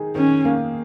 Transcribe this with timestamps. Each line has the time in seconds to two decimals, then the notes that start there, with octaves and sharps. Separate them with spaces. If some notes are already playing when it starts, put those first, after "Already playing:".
Already playing: D#3 D#4 G#4
0.15 D#3 C#4
0.45 A#3